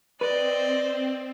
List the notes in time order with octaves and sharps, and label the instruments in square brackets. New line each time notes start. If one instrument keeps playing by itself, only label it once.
[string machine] C4 [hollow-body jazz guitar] B4 [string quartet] D5 D#5